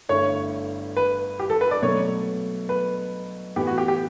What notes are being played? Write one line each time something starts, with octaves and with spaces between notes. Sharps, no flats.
G1 G2 D3 A3 E4 C#5
B4
G4
A4
B4
D5
B2 F#3 A3 C#5
B4
A2 E3 B3 G4
F#4
G4
G4